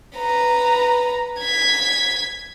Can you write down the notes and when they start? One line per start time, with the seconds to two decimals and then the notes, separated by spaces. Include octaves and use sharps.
0.18 B4 A#5
1.41 G#6 B6